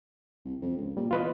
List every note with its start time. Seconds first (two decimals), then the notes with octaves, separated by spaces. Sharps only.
0.45 C2
0.62 F2
0.77 C#2
0.97 A#2 G3
1.11 E2 F4 B4 D#5